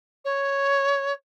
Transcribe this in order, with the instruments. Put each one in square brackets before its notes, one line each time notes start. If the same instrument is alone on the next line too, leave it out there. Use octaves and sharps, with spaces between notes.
[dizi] C#5